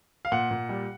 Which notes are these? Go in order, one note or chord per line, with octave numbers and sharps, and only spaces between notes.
F5
A#2 F#5
A#2
G3